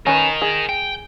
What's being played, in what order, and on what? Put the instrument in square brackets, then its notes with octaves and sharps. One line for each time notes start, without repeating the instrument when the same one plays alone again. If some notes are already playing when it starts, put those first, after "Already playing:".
[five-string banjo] C#4 B4 [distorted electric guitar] A#4 D#5
[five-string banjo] G#4
[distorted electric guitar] G5